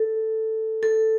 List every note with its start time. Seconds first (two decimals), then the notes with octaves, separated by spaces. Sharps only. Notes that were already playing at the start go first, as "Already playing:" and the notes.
Already playing: A4
0.83 A4